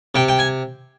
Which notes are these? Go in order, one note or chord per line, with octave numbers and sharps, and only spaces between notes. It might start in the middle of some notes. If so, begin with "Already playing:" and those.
C3 G5
G5
G#5